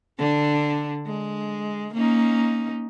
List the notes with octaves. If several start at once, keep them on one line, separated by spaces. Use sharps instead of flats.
D3 D4
G#3
A#3 C#4 D#4